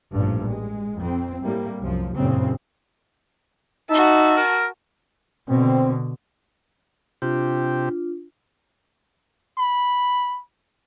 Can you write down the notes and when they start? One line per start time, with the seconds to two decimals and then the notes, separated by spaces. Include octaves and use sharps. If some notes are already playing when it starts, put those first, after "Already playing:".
0.12 A1 G2 A#2 F3
0.48 G#3
0.98 F2 C4
1.43 A2 G3 A#3
1.81 C2 F#2 F3
2.16 F#1 G2 A#2 C#3 C4
3.90 D#4 F#4 E5 A5
4.37 A#4
5.48 B2 D3 C4
7.22 C3 D4 F4 G4
9.58 B5